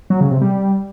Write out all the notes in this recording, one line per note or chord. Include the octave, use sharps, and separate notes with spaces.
F#3
C#3
C3
G3